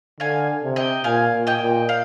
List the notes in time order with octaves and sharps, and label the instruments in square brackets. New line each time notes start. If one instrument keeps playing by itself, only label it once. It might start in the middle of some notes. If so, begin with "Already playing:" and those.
[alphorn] D3 [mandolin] F5 G#5
[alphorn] C3
[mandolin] D#5 G5
[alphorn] A#2 [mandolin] F5 G#5
[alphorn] A#2
[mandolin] D#5 G5
[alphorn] A#2
[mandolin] F5